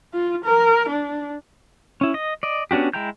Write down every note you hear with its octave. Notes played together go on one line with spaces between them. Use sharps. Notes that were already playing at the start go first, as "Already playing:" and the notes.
F4
A#4
D4
C#4 E4
D#5
D5 D#5
B3 C#4 D4 F#4 G4
G#3 E4 G5 A#5 G6